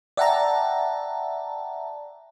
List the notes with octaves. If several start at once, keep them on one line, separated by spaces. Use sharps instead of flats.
D5 E5 F#5 G5 A5 A#5